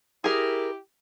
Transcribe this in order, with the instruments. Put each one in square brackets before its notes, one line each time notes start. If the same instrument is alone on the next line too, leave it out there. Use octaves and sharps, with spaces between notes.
[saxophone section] E4 G4 [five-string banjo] G#4 A#4